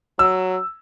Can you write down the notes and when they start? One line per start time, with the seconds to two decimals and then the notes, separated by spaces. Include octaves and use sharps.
0.19 F#3 E6